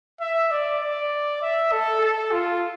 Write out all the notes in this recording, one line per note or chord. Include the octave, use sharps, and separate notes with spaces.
E5
D5
D5
E5
A4
A4
F4